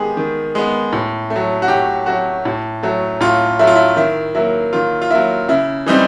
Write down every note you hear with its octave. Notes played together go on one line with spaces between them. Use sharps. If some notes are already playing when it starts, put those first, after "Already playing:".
Already playing: D#3 G#3 B3 G4 G#4
D#3
G#3 B3
A2
A3
F#3
F#4
A2 G4
F#3 A3 F#4
A2
F#3 A3
A2 F4
F#3 A3 E4
F4
E4
D#3 E4
F#3 A#3 E4
D#3 F4
F4
F#3 A#3 E4
C#3 E4
E3 G3 C4 D#4